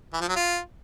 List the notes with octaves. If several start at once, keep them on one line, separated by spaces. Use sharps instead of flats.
E3
F3
F#3
F4